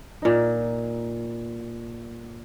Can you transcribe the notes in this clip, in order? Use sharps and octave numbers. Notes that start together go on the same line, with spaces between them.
A#2 D#4